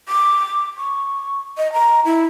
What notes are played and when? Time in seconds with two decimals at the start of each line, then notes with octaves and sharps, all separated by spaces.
0.09 D6
0.78 C#6
1.58 D#5
1.73 A#5
2.05 E4